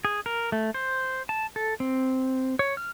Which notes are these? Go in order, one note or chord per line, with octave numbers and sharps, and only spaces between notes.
G#4
A#4
A3
C5
A5
A4
C4
C#5
F6